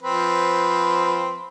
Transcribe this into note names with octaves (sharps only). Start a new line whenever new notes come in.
F3 C4 B4